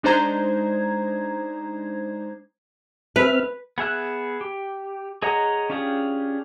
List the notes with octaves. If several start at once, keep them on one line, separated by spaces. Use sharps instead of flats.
G#3 D4 D#4 C5 A#5 G#6
C4 B4 E5 F6
B3 G#4 E5 F#6
G4
G#4 C#5 D#5 F#5 A#5
C#4 D4 F4 G4 G#4